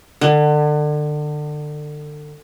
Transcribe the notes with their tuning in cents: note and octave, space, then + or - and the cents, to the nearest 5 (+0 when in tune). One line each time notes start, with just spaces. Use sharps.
D3 +30